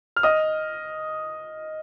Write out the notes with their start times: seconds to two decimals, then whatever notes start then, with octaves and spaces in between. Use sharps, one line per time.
0.16 F6
0.23 D#5 D#6